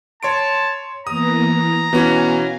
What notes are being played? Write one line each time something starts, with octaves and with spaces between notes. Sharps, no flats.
C#5 A5 C6 D7
E3 A#3 B3 A#5 D#6
B2 E3 C#4 F#4 F5 G#5